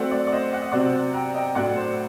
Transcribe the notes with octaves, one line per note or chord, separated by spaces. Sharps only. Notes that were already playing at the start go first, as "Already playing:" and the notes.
Already playing: F#3 A3 C4 D5 F#5
D5
D5
C5 D#5
F#5
D#5
C3 F#3 C4 D5 F#5
G5 A#5
D#5 G5
A2 F#3 A3 D4 D5 F#5
C5